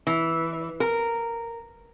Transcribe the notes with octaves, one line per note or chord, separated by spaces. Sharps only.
E3
A#4